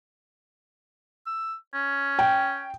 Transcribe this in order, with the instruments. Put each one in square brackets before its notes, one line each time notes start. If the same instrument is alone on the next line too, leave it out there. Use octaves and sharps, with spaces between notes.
[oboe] E6
C#4
[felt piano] G5